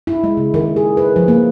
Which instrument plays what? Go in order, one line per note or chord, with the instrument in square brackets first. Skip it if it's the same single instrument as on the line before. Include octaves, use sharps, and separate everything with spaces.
[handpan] E4
G#3
C#3
D#3
G#4
B4
F3
A#3